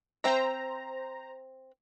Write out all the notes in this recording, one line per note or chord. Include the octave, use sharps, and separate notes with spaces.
C4 C5 E5 A#5